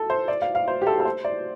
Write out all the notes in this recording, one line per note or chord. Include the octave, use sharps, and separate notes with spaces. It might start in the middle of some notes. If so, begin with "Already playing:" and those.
Already playing: A4
C5
D5
F5
F5
C5
G4
A4
A4
C5
D5